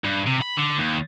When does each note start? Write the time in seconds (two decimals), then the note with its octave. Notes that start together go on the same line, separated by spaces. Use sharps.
0.04 G2
0.27 C3
0.42 B5
0.57 D3
0.78 D#2